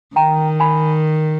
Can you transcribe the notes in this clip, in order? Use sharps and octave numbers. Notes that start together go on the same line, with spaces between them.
D#3 G5 A#5
G#5 B5